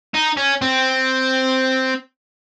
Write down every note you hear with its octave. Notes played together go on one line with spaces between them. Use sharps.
D#4
C#4
C4